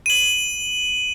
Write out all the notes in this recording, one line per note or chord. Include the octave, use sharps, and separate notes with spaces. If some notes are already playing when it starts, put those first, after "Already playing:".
D#7 F#7